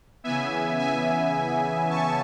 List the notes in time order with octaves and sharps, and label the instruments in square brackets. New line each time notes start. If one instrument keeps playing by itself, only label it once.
[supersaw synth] C#3 E3 B3 E5 G#5
E5 G#5
A5 C#6